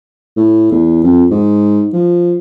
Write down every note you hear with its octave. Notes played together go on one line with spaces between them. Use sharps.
A2
E2
F2
G#2
F3